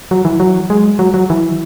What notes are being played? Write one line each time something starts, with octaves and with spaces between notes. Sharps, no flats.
F#3
E3
F#3
G#3
F#3
F#3
E3